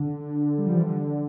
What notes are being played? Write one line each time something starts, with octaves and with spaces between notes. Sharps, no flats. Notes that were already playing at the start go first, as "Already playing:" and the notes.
Already playing: D3
G3
F3
E3
D3